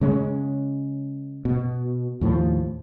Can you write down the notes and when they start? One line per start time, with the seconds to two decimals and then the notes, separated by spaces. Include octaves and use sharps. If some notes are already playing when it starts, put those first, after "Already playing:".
0.01 C#3 G#3 C#4
1.45 B2
2.21 D#2 A2 F3